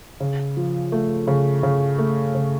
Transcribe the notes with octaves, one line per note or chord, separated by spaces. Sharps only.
C#3
F3
A3
C#3
C#3
A3
C#3